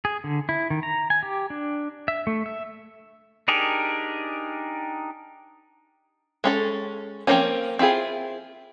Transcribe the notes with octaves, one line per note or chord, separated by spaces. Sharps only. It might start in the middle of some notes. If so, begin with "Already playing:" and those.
G#4
D3
E4
D#3
A#5
G#5
G4
D4
E5
A3
E5
D4 D#4 G4 G#4 A#4
G#3 C#4 A4
F3 F#3 A#3 C4 C#4
C4 E4 F4 G#4